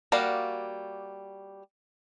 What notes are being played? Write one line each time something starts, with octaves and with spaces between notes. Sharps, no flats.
G3 A#3 F#4 D5 F5